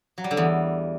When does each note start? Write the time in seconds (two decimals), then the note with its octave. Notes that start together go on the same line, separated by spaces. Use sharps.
0.18 F#3
0.24 G3
0.31 D3
0.37 E2